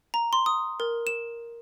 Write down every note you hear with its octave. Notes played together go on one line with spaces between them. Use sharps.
A#5
C6
D#6
A#4
E7